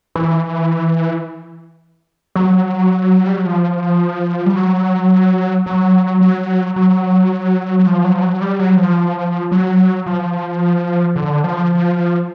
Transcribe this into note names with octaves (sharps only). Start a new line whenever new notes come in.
E3
F#3
G3
F#3
F3
G3
F#3
F#3
F#3
F#3
F#3
F3
F#3
F3
F#3
G3
F#3
F3
F#3
F3
D3
F3